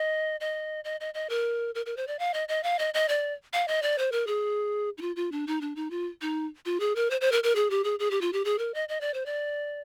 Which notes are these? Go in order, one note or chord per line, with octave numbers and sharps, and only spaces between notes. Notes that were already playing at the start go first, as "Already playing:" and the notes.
Already playing: D#5
D#5
D#5
D#5
D#5
A#4
A#4
A#4
C5
D5
F5
D#5
D#5
F5
D#5
D#5
D5
F5
D#5
D5
C5
A#4
G#4
D#4
F4
F4
D4
D#4
D4
D#4
F4
D#4
F4
G#4
A#4
C5
C5
A#4
A#4
G#4
G4
G#4
G#4
G4
F4
G4
G#4
A#4
D#5
D#5
D5
C5
D5